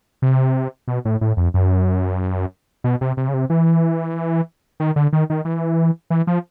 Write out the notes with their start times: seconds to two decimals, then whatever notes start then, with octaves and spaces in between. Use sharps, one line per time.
0.22 C3
0.88 B2
1.05 A2
1.21 A2
1.37 F2
1.54 F#2
2.84 B2
3.01 C3
3.17 C3
3.28 C#3
3.34 C3
3.50 E3
4.80 D#3
4.96 D3
5.13 D#3
5.30 D#3
5.45 E3
6.10 E3
6.27 F3